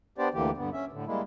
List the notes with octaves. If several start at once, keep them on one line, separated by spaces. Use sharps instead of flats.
B3 D4 G4 C5 D5
D2 D3 E3 A#3 G4
G2 D3 B3
C#4 E5
A2 D3
G3 G#3 A#3 E4